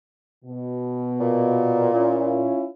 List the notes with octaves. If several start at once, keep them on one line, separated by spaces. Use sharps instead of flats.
B2
A#2
C#4 E4 F4